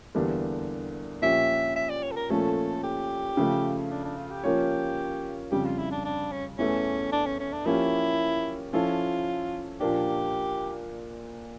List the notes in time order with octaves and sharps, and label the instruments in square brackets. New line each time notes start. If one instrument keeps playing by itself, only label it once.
[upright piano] E2 D3 G3 A#3 D4
[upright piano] A#2 F3 C#4 G4 [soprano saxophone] E5
[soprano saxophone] E5
D5
C#5
A4
A#4
[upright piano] A#2 F3 A3 C#4 [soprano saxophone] A4
[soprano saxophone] G4
[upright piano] C#3 F3 A3
[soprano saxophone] D4
D4
F4
G4
[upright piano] F3 A#3 C#4 F4 C#5 [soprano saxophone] G4
[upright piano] F2 C#3 G3 [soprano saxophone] G4
[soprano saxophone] F4
E4
D4
D4
C#4
[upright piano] E2 E3 A3 [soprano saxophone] C#4
[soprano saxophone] D4
C#4
C#4
D4
[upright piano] F3 A#3 C#4 G4 [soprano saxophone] E4
[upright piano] F3 C#4 E4 A4 [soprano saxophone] F4
[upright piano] A#2 F3 A#3 D4 [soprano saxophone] G4